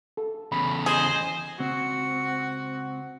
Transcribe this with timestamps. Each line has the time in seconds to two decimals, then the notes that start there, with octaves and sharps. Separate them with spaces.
0.17 A4
0.52 E2 C#3 B5
0.86 G#4 C5 D#5
1.59 C#2 C4 F#4